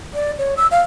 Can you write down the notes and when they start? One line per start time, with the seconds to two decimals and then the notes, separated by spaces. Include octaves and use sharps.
0.14 D5
0.38 C#5
0.57 E6
0.71 F5